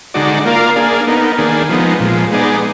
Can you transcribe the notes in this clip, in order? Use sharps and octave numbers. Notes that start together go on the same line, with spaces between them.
D3 G#3 D#4 F#4 D5
A#3 F4 A#4 D5 F5
A#3 D4 G#4
B3 D#4 A#4
D#3 A#3 D4 G#4
F3 G#3 B3 D#4
A#2 F3 G#3
G#3 B3 D#4 G#4 D5